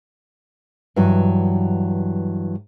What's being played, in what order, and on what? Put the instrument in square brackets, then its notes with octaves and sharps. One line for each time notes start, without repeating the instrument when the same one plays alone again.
[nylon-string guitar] G2 E3 F#3